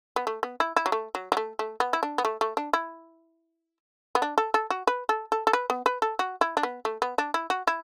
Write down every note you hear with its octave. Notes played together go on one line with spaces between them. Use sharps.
B3
A3
B3
E4
E4
F#3
A3
F#3
F#3
A3
A3
B3
E4
D4
B3
A3
A3
D4
E4
B3
D4
A4
A4
F#4
B4
A4
A4
A4
B4
B3
B4
A4
F#4
E4
D4
B3
A3
B3
D4
E4
F#4
E4